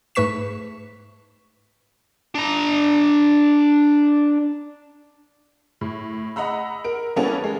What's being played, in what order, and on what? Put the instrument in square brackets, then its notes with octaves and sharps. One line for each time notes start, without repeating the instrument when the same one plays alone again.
[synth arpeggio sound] G#2 A3 B4 C#6 B6 E7
[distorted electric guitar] D4 A#5
[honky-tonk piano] A2
D#5 F#5 A#5 B5 E6
A#4 D7
E3 G3 A#3 B3 C#4 A4
G#3